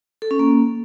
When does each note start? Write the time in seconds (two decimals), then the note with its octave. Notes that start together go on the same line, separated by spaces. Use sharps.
0.22 A4
0.31 C#4
0.39 A#3